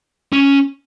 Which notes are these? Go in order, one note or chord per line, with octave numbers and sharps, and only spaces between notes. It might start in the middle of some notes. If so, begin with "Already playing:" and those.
C#4